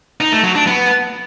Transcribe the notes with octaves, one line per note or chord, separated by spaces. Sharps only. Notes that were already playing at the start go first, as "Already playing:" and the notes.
D#4
A3
F#3
D4
B3